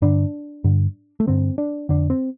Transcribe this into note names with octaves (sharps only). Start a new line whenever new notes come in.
G2 D3 D4
G2 D3
A3
G2 D3 C4
D4
F2 D3 D4
C4